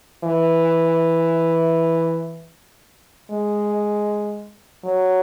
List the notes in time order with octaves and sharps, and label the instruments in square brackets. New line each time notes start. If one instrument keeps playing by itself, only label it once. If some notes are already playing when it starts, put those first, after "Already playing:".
[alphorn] E3
G#3
F#3